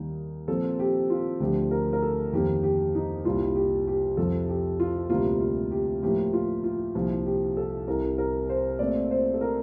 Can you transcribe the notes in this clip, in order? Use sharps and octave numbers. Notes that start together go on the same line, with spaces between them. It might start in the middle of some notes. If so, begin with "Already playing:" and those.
Already playing: D#2 D#3 G3
A#2 F3 C4 A4
G4
F4
D2 D3 F3 G4
A#4
A#4
A4
F2 D#3 A#3 G4
G4
D#4
C2 A#2 G3 F4
G4
G4
F2 C3 F3 A4
G4
F4
D2 C3 G3 A#3 F4
F4
G4
A2 F3 A#3 G4
F4
F4
C2 A#2 F3
G4
A4
C2 C3 G3 A#4
A#4
C5
A#2 A3 C4 D5
C5
A4
A#4